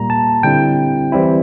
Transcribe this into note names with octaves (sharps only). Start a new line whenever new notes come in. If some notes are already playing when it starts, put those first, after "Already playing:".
Already playing: A#2 G3 A#3 A#5
A5
D3 G3 C4 E4 G5
E3 G3 C4 E4